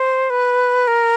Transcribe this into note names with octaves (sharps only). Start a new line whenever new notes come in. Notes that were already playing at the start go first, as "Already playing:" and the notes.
Already playing: C5
B4
A#4